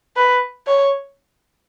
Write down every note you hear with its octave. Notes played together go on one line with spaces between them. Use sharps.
B4
C#5